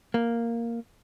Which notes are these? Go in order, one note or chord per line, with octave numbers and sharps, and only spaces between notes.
A#3